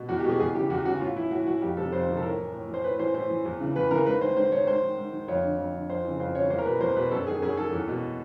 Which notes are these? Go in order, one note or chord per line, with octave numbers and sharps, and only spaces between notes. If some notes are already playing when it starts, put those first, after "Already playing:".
Already playing: B2
E2 F#4
G4
B2
G#4
E2 G#4
C#3 E3 G4
E2 F#4
C#3 E3 F#4
A2 F4
E3 E4
A2 F#4
E3 F#4
F2 G4
C3 D#3 A4
F2 C5
C3 D#3
A4
A2 A#4
E3
A2
E3
C5
A2 B4
E3 C5
A2 C5
E3
E2
C#3 E3
E2 B4
C#3 E3 A#4
G#2 B4
D#3 C5
G#2 C5
D#3 C#5
G#2 C5
D#3
G#2
D#3
F2 C#5
D3
F2
D3
F2 C5
C#3 E3
F2 C5
C#3 E3 C#5
E2 C5
A#4
B2 B4
E2 C5
B2 B4
F#2 A4
D#3 G#4
F#2 G#4
D#3 A4
E2
B2